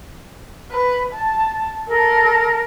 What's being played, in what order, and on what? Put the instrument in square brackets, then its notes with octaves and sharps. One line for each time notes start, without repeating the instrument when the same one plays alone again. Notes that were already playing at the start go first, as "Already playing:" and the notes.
[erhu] B4
A5
[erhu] A4 [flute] A#4